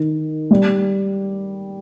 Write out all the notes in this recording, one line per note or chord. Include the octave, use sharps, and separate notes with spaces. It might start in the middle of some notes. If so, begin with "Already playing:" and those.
Already playing: D#3
G3